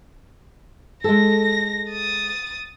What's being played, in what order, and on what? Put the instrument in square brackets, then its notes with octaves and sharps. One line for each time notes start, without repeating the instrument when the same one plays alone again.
[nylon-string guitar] G#3 A4 [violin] A#6
[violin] D#6 A6